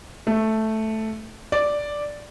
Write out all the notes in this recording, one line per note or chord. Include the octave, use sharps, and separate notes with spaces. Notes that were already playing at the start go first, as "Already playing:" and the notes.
A3
D5